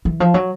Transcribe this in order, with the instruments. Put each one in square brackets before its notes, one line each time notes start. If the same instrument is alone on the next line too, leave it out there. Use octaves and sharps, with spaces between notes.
[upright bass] E3
F3
F#3